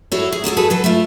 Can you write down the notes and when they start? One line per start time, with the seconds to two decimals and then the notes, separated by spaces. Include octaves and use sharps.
0.12 E4 F#4 G#4 A4 C#5
0.32 G#4
0.44 F#3 F#4 G#4 A4
0.57 F#4 G#4 A4 B4
0.70 F#3 A4 B4
0.84 A3 E4 F4